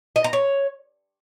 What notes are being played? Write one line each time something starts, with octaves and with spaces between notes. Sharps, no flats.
D#5
A#5
C#5